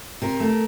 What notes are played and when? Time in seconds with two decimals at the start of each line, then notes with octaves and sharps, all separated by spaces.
0.22 C3 A#4
0.40 A3